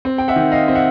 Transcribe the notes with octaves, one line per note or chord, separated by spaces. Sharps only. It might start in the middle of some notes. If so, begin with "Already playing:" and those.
C4
G5
E5 F#5
D#3
D#5 F5
C4
E5 F#5